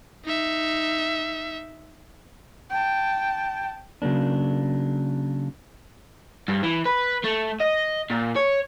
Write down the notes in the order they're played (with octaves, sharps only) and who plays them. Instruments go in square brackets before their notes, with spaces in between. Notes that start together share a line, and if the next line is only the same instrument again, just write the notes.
[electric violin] D#4 E5
[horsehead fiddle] G5 A5
[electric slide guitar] C#3 F#3 A#3 D4
[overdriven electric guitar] G2
E3
B4
A3
D#5
A#2
C#5